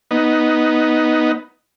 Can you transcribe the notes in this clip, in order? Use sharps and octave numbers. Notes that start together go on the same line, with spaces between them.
B3 D#4